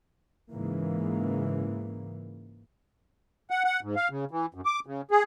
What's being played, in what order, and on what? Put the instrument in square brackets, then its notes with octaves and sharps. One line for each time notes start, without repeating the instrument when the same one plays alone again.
[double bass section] G#2 C#3 E3 A#3
[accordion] F#5
F#5
G#2
F5
C#3
E3
F#2
D6
C#3
G#4